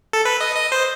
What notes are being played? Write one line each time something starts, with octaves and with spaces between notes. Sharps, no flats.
A4
B4
D#5
D#5
C5